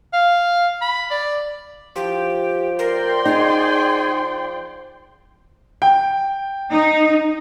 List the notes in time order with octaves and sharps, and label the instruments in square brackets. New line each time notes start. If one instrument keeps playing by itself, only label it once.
[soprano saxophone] F5
B5
D5
[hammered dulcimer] F3 [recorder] G4
[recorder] A#4 [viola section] D5 G5 C6
[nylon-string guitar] D#4 [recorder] G#4
[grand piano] G5
[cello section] D#4